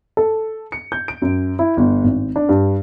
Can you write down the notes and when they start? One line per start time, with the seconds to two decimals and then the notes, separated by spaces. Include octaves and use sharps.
0.17 A4
0.72 C#7
0.92 G6
1.08 D7
1.22 F#2
1.59 E4
1.77 G1
2.04 G#1
2.36 D4
2.49 G2